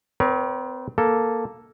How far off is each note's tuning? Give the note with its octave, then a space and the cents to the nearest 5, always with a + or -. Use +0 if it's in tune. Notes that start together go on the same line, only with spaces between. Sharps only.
C4 -35 A#4 +40 C#5 +35
A#3 +0 A4 +0